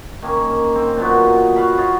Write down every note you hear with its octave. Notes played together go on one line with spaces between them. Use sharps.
D#3 A#3 C#4
C4 C5
A#2 F#3 B3
F#4 F5 B5
F4 F#4 C#5 D#5